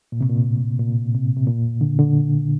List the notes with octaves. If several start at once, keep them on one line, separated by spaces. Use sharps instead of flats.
A#2
C3
A#2
A2
A#2
C3
C3
A#2
D3
D3